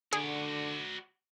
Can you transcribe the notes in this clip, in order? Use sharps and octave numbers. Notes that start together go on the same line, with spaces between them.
D3 F#4 G#4 D5